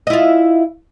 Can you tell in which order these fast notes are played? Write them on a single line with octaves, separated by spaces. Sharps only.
D#5 E4 F4